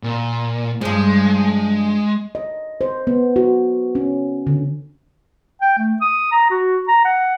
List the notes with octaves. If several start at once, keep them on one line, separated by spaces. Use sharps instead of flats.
A#2
G2 F3 G#3
D#5
C5
B3
F#4
C#4
D3
G5
A3
D#6
A#5
F#4
A#5
F#5